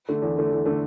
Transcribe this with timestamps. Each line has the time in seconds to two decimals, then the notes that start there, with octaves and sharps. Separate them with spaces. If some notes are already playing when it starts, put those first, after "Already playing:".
0.09 D3 A3
0.22 E2
0.37 D3 A3
0.51 E2
0.66 D3 A3